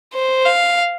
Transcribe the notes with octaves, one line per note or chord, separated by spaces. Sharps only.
C5
F5